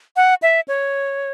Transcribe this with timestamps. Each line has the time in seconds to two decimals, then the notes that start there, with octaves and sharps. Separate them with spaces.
0.16 F#5
0.42 E5
0.68 C#5